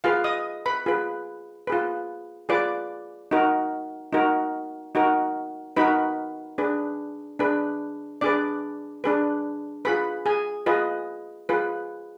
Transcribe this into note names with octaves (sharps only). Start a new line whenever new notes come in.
F4 G#4 B4 F5
D#5 D#6
B4 B5
F4 G#4 B4
F4 G#4 B4
F4 G#4 B4 D5 D6
D#4 F#4 A#4
D#4 F#4 A#4
D#4 F#4 A#4
D#4 F#4 A#4 B4 B5
D4 G#4 B4
D4 G#4 B4
D4 G#4 B4 D5 D6
D4 G#4 B4
F4 G#4 B4 B5
G#4 G#5
F4 G#4 B4 D#5
F4 G#4 B4